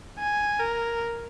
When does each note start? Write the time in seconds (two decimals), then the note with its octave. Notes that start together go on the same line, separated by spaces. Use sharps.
0.20 G#5
0.60 A#4